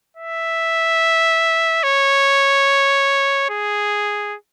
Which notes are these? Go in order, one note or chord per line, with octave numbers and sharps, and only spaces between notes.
E5
C#5
G#4